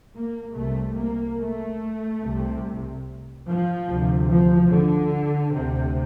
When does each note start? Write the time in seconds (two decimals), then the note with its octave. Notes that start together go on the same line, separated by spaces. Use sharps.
0.13 A#3
0.54 C2 C3 A3
0.96 A#3
1.38 A3
2.22 C2 C3
3.46 F3
3.88 D2 C3
4.29 F3
4.70 D3
5.54 D2 C3